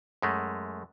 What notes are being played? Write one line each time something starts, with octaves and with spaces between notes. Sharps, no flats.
F#2 G#3 A3